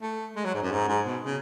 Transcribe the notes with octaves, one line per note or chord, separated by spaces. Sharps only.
A3
G#3
F#3
G#2
F#2
G#2
G#2
B2
C#3